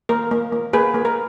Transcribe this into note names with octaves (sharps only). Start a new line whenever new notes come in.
A#3 A#4
A#3
A#3
A#3 G#4 B4
A#3
A#4